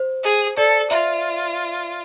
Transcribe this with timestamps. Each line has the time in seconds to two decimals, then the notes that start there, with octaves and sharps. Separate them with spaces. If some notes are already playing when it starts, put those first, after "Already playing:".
Already playing: C5
0.23 G#4
0.57 A4 D5
0.91 F4 E5